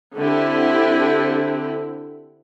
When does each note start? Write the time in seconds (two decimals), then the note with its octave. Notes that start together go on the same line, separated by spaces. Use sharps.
0.16 D3 C4 E4 G4